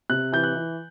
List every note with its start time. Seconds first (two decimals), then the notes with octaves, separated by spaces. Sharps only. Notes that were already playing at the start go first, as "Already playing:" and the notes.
0.10 C3 F#6
0.32 E3 G6
0.44 F#6
0.55 E3